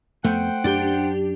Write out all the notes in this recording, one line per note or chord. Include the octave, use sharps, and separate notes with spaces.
F2 A3 B3 C5 F#5 G5
F#2 D4 G4